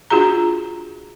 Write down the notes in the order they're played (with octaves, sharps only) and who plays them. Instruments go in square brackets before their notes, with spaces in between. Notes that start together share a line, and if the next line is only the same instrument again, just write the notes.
[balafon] D4 F4 F#4 G#4 A#5